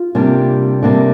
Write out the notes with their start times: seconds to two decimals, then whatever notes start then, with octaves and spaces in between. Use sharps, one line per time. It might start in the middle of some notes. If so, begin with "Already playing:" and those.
Already playing: F4
0.15 C3 G3 A#3 D4
0.83 C3 G3 A#3 D4